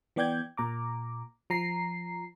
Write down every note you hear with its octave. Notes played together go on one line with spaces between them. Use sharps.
E3 B3 D5 G5 G6 G#6
A#2 A#5 D6
F3 A#5 C7